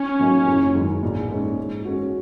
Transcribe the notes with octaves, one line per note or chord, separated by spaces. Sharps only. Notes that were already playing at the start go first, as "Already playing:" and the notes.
Already playing: C#4
F#3 A#3 D#4
F#1
F#2 D#3 G#3
A#1
G#2 G#3 C#4
G#2
G#3 C#4 F#4